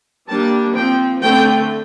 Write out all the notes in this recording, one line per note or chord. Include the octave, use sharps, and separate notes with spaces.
G3 A#3 D4 A5
F3 C4 G5
D3 A3 C4 G5